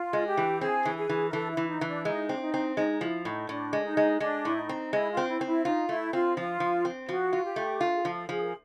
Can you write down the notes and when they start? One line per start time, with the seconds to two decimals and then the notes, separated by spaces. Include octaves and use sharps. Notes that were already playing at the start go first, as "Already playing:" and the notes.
Already playing: F4
0.13 G#3
0.26 G4
0.37 E3
0.61 C4 G#4
0.85 E3
0.97 G#4
1.09 E3
1.30 A#4
1.33 E3 A4
1.51 E4
1.57 E3
1.69 D#4
1.81 E3
1.87 D4
2.05 G#3 D#4
2.29 C4
2.36 D4
2.41 D#4
2.54 C4
2.77 G#3 D#4
3.01 F3 E4
3.25 A2 D#4
3.49 A2 D4
3.73 G#3
3.85 D#4
3.97 G#3
4.20 G#3 D4
4.45 A2 E4
4.57 D#4
4.69 C4
4.93 G#3 E4
5.11 F4
5.17 C4
5.28 E4
5.41 C4
5.47 E4
5.65 D#4 F4
5.89 A3 E4
6.13 C4 F4
6.37 F3 F4
6.60 F3
6.85 C4
7.08 F3 F#4
7.33 F4
7.44 G4
7.56 A3
7.81 F4
7.96 G#4
8.04 F3 A4
8.29 F3 G#4
8.41 A#4